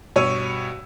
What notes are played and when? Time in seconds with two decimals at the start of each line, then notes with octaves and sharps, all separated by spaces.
0.16 G2 B2 C#5 E6 D#7